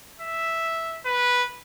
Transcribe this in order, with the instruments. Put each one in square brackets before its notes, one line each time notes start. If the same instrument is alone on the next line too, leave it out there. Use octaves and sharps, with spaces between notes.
[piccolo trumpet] E5
B4